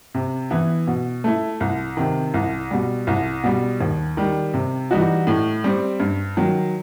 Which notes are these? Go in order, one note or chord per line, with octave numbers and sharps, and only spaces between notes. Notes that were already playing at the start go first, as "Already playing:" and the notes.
C3
E3 B3 E4
B2
A3 E4
C2
C3 D#3
C2
B2 G3
C2
B2 G3
D#2
D#3 G3
C3
E3 G3 D#4 F#4
A2
G3 C4
G2
D#3 F#3